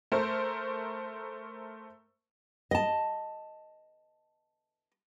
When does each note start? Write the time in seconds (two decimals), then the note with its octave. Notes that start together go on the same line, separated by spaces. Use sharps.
0.12 A3 A#4 C5
2.71 D#5 A5